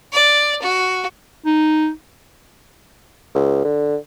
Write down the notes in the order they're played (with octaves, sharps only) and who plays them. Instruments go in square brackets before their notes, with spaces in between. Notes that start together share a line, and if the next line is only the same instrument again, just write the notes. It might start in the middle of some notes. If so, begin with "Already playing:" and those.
[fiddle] D5
F#4
[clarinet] D#4
[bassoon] C#2
D3